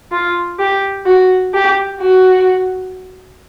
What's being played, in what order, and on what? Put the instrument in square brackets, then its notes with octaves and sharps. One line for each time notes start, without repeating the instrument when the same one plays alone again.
[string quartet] F4
G4
F#4
G4
F#4